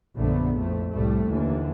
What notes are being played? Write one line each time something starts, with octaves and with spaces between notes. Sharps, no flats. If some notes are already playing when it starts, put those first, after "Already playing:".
A#1 F#2 D3 A3 B3
F2 A2 A3
C2 A2 G3 A3
D#2 D3 E3